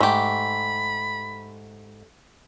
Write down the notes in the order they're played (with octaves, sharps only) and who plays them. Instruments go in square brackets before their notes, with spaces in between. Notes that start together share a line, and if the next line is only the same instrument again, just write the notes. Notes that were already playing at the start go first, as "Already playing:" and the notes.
[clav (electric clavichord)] G#2 [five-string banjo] A3 G4 [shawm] B5